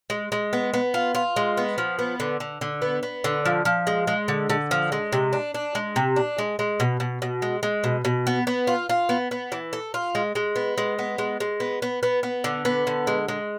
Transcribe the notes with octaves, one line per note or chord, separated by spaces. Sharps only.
G#3
G#3
B3
B3
F4
F4
G#3
B3
F3
B3
D3
D3
D3
B3
B3
D3
F3
F3
G#3
G#3
D3
D3
F3
G#3
C3
D4
D4
G#3
C3
D4
G#3
G#3
B2
B2
B2
G#3
G#3
B2
B2
B3
B3
F4
F4
B3
B3
E3
A4
F4
G#3
G#3
B3
G#3
B3
G#3
G#3
B3
B3
B3
B3
D3
B3
D3
G#3
G#3